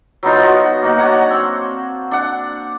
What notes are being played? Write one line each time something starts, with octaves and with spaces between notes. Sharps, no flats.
F#3 B3 D#4 F4
F#4
A#3 D#4 F#4
D4 F#4 C#5 F#5
C4
D4 F#5